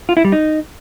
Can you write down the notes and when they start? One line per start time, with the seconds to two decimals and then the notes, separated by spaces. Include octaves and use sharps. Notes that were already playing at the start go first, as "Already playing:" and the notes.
0.09 F4
0.17 E4
0.24 G3
0.32 D#4